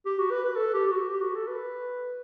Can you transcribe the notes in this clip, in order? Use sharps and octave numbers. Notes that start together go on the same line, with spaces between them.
G4
F#4
B4
B4
A4
G4
G4
F#4
G4
F#4
A4
B4